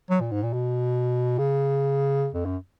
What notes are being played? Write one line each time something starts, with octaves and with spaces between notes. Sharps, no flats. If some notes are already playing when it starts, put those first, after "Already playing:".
F#3
A#2
G#2
A#2
B2
C#3
F2
F#2